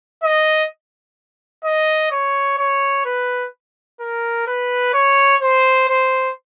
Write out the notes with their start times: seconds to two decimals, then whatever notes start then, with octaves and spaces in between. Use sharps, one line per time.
0.24 D#5
1.64 D#5
2.11 C#5
2.58 C#5
3.05 B4
4.00 A#4
4.47 B4
4.93 C#5
5.41 C5
5.89 C5